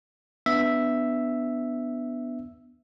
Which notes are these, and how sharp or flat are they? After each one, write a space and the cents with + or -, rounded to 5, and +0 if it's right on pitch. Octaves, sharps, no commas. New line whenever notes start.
B3 +0 D4 +0 E5 +0